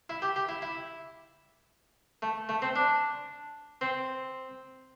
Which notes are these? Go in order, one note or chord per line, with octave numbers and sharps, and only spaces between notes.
E4
G4
G4
E4
E4
A3
A3
C4
D4
C4